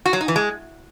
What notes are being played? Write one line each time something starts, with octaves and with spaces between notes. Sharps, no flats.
F#4
F#3
D#4
E3
G#3